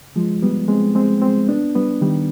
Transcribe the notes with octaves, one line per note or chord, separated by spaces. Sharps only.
F3 G#3
G3 B3
G#3 C4
G#3 C4
G#3 C4
B3 D4
G3 B3
D#3 G3